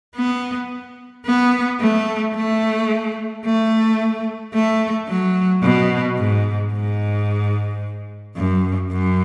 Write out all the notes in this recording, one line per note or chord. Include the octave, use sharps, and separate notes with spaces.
B3
B3
A3
A3
A3
A3
F#3
B2
G#2
G#2
F#2
F#2